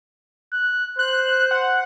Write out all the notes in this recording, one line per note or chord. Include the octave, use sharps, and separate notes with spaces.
F#6
C5 F#6
F#5